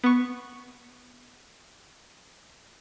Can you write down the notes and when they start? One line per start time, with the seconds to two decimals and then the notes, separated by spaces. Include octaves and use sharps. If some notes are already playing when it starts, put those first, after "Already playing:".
0.04 B3 C#6